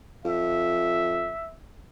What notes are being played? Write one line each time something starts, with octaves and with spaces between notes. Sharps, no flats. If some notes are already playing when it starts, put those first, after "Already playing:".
F2 E5